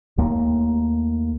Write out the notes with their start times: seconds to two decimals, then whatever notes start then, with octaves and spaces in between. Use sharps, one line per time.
0.18 D#2 A3 A#3